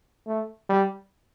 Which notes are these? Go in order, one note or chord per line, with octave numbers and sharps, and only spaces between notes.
A3
G3